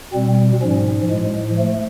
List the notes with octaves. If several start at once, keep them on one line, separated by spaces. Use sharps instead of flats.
B2 G3 C4
G#2 F3 C#4
A2 F3 G#3
F3 A3